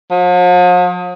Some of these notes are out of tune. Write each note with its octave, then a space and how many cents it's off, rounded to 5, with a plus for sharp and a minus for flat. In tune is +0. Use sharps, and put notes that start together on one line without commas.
F3 +45